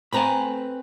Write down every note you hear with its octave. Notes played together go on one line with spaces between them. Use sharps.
A3 C4 B4 G#5 A#5 B5